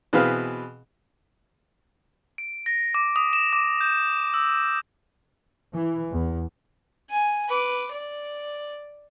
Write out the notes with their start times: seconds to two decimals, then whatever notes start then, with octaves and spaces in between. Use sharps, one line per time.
0.13 B2 E3 C4 G#4 B4 F5
2.38 D7
2.66 A#6
2.94 D6
3.16 D#6
3.33 E7
3.53 D6
3.81 G6
4.34 E6
5.74 E3
6.12 E2
7.10 G#5
7.49 B4 D6
7.91 D5